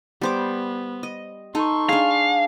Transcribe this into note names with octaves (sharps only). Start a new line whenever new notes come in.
G3 B3 C5 D6
D#5
D#4 A4 C6 C#6
D4 G#4 F5